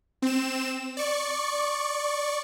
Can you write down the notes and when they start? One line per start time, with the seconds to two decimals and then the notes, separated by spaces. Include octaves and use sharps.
0.22 C4 E7
0.97 D5 C#6